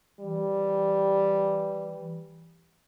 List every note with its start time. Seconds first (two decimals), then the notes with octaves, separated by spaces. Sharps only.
0.20 E3 G3